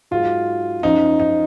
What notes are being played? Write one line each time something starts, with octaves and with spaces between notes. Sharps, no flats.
G#2 F#3 F4
F#2 F3 D#4
D#4